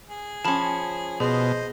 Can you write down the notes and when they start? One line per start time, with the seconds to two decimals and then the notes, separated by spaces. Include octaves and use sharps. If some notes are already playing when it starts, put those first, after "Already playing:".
0.09 G#4
0.45 F3 C#4 A5 B5
1.20 B2 G#4 C5 D#5